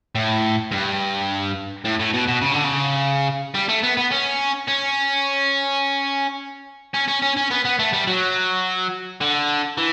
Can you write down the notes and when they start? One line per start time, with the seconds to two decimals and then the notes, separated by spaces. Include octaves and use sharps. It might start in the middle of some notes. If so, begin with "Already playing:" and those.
0.15 A2
0.72 G2
1.85 A2
2.00 A2
2.13 B2
2.28 B2
2.42 C#3
2.53 D3
2.64 C#3
3.55 G3
3.69 A3
3.83 B3
3.97 B3
4.12 C#4
4.68 C#4
6.94 C#4
7.08 C#4
7.23 C#4
7.37 C#4
7.51 B3
7.65 B3
7.79 A3
7.93 G3
8.07 F#3
9.21 D3
9.78 E3